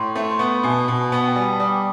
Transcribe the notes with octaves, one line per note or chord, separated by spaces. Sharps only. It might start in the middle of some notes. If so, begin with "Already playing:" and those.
Already playing: A2 C6 C#6
A3
C6
B3 C#6
B5
B2 G#5
A5
B2
B3
G5
G3 G#5
A5
G3 D#6
D6